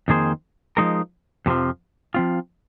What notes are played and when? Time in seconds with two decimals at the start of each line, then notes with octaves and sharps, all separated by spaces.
0.08 F2 D#3 A#3 G#4 C5
0.77 F3 G#3 D#4 A#4
1.46 F2 C3 F3
2.14 F3 C4 F4